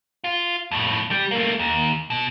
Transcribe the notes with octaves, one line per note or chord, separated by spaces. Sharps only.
F4
F2 A2
G3
A3 A#3
D#2
B2